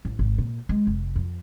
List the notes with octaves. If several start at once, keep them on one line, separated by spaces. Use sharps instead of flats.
A1
G#1
A#2
G#3
F1
F2